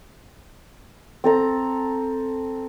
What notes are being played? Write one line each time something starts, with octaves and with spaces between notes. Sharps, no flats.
C4 A4 A#5